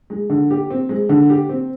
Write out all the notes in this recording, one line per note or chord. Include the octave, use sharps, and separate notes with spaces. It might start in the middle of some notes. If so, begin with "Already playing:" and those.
G#3
D3
G4
C4
G#3
D3
G4
C4